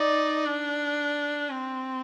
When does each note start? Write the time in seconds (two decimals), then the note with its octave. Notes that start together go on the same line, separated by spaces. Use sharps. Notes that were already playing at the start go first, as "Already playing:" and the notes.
Already playing: D#4 D5
0.45 D4
1.50 C4